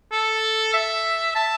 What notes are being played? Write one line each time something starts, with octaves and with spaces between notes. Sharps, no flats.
A4
E5
A5